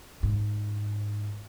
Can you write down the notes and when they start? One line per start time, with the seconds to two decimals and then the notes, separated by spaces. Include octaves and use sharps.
0.23 G#2